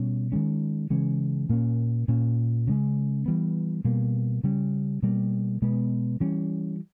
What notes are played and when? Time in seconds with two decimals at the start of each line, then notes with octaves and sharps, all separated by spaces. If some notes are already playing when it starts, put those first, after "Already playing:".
Already playing: B2 G3 C#4
0.32 D#3 G#3 C#4
0.90 C#3 E3 G#3 C#4
1.49 A#2 A#3 C#4
2.08 A#2 A#3 C#4
2.67 C#3 G#3 C#4
3.26 E3 G3 B3
3.85 B2 G3 A#3
4.44 C#3 G3 C#4
5.02 B2 G3 A#3
5.62 B2 G#3 B3
6.20 E3 G3 C#4